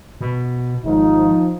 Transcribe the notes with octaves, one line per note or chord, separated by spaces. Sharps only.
B2
G#1 F3 D#4